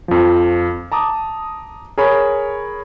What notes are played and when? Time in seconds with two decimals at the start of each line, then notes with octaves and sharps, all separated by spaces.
0.08 F2 F3
0.92 A5 A#5 D6 D#6
1.98 G#4 A#4 C#5 B5